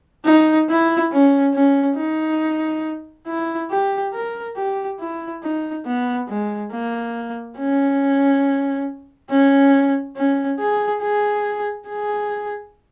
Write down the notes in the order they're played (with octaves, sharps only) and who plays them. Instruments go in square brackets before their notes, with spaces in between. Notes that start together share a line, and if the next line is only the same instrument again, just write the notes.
[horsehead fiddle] D#4
E4
C#4
C#4
D#4
E4
G4
A#4
G4
E4
D#4
B3
G#3
A#3
C#4
C#4
C#4
G#4
G#4
G#4